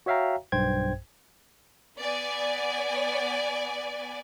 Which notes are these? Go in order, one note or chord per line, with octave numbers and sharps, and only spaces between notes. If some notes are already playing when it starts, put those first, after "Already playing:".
F#4 C#5 E5 F5 G5 A#5
B1 G2 C5 G5 G#6
B3 D5 G#5